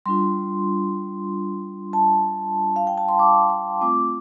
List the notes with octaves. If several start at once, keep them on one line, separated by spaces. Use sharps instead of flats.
G3 D4 F4 C6
A5
F5
G5
A5
C6
D6
D6
A3 C4 F4 D6